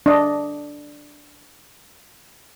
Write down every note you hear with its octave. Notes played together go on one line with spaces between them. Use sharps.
D4 D#5